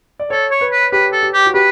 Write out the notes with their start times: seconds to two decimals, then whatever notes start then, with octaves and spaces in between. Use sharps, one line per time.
0.20 D5
0.30 A4 C#5
0.51 C#5
0.61 B4
0.72 B4
0.92 G4 B4
1.12 A4
1.23 G4
1.33 G4
1.46 F#4
1.54 G4 B4